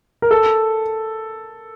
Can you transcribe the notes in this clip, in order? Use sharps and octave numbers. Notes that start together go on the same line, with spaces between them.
A#4
A4